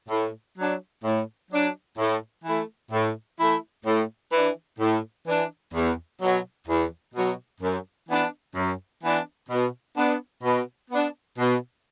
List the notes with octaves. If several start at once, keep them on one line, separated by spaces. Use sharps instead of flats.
A2
F#3 D4
A2
F#3 D4
A2
E3 A3 E4
A2
E3 A3 E4
A2
E3 D4
A2
E3 D4
E2
B2 F#3
E2
B2 F#3
F#2
E3 B3 D4
F#2
E3 B3 D4
B2
B3 D4
B2
B3 D4
B2